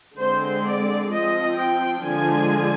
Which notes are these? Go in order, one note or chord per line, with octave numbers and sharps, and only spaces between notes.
D3 G#3 C4 C5
D5
F3 C4 D#5
G5
D3 F3 G#3 D4 G#5